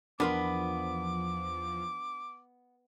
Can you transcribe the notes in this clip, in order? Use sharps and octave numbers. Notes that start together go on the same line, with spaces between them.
E2 F3 B3 D4 A#4 C6 D6